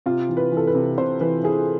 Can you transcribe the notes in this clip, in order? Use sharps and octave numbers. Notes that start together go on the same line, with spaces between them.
C3 F4
E3
B4
E3 A4
B4
C3
C3 C5
E3 B4
E3 G#4